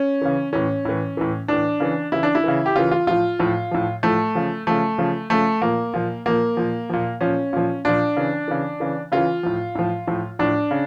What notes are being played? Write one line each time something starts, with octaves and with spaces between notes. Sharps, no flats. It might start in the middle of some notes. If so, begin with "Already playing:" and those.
Already playing: C#4
C#3 E3
A2 E3 C#4
A2 E3
A2 E3
A2 E3 D4
C#3 E3
C#3 E3 E4
D4
E4
C#3 E3
G4
C#3 E3 F4
F4
A2 F3 F4
A2 F3
A2 F3
A2 F3 A3
C#3 F3
C#3 F3 A3
C#3 F3
C#3 F3 A3
A#2 F3 A#3
A#2 F3
A#2 F3 A#3
A#2 F3
A#2 F3
A#2 F3 C#4
A#2 F3
A#2 F3 D4
C#3 E3
C#3 E3
C#3 E3
C#3 E3 F4
A2 F3
A2 F3
A2 F3
A2 F3 D4
C#3